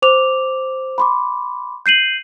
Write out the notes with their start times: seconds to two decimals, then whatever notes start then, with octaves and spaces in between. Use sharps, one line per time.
0.02 C5 D6 F7
0.98 B5 C6 D6
1.86 G6 C7 D#7 F#7